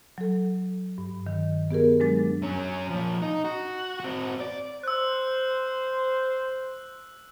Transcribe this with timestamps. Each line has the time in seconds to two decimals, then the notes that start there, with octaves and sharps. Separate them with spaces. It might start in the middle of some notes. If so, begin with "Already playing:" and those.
0.18 F#3 A4
0.98 G2
1.27 D#3
1.71 B3 G4 G#4 A#4
2.00 F#3 G#3 D4 A6
2.42 F#2 C#4
2.90 A#2 F3
3.22 D#4
3.45 F#4
4.00 C4 F#4
4.40 D5
4.83 C5 E6 F#6